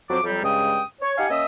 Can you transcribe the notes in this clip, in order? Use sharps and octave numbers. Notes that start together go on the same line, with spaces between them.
F2 F#3 C4 C5 D6
F2 F#3 G3
G2 C#3 G#3 G5 D#6
C#5
D#4 G4 F5 F#5 G#5
A#3 C#4 D#5 E5 D#6 E6